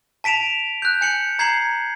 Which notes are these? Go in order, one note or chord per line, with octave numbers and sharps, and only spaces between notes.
A5 B6 D7 E7 F7
F#6 G6
G#5 C#7 F#7
A#5 G#6 C7 C#7 F#7